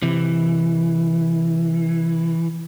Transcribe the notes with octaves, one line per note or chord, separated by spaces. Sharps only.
C3 E3